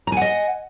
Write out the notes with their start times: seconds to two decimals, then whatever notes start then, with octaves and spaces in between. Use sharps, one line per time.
0.07 A#5
0.12 G#5
0.17 F#5
0.21 D#5